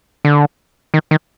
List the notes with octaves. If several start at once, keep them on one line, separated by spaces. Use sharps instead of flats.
D3
D#3
D#3